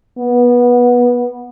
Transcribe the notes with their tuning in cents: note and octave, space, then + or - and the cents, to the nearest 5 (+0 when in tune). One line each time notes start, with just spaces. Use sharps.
B3 -20